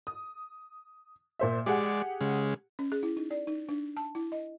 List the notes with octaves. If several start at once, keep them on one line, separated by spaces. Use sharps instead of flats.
D#6
A#2 C5 E5
G#3 G4 G#4 D5 F#5
C#3 G#3
C#4
G#4
E4
D#4
D5
D#4
D4
A5
E4
D#5